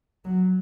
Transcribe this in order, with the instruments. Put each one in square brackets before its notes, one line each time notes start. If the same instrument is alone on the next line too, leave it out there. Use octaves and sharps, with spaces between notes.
[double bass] F#3